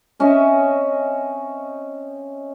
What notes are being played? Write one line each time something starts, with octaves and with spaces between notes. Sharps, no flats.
C4 C#4 D#5 E5